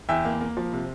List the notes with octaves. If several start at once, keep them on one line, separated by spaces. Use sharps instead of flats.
E2 E5 G5
A#3
A#3
F3
C3